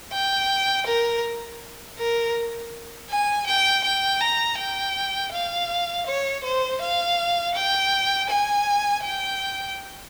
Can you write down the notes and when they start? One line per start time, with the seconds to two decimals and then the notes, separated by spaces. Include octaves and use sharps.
0.13 G5
0.87 A#4
1.98 A#4
3.10 G#5
3.47 G5
3.84 G5
4.21 A#5
4.58 G5
5.32 F5
6.07 C#5
6.44 C5
6.81 F5
7.55 G5
8.30 G#5
9.04 G5